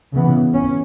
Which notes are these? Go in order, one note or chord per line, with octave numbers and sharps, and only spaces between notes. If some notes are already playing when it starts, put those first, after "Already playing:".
C#3 E3 B3
C#4